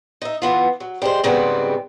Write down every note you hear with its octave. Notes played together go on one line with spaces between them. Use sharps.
D#4 E5
E3 B3 F4
F#3
G3 G#3 C5
G#2 C#3 G3 B3 C4 F#4